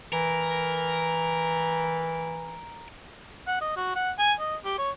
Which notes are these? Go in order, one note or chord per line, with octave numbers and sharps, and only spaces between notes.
E3 A#4
F#5
D#5
F#4
F#5
G#5
D#5
G4
C#5